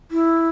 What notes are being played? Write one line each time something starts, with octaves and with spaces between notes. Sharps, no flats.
E4